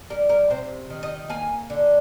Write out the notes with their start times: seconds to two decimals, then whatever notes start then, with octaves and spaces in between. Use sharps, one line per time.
0.10 G3 A#4
0.29 A#4
0.50 C3 C5
0.90 D#3
1.03 D#5
1.30 A#3 G#5
1.70 D3